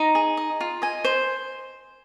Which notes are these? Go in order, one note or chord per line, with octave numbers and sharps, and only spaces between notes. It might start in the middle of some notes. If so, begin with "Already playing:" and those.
Already playing: D#4 A#5
G#4
D#5
F4
D#5 G#5
C5